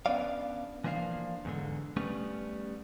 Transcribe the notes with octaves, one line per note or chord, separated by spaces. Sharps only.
B3 C#4 D4 D5 F5
E3 F3 A#3 D4 F5
E2 G#2 D3
G3 A3 B3 C#4